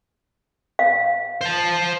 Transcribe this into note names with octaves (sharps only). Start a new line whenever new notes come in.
F5
C5 A5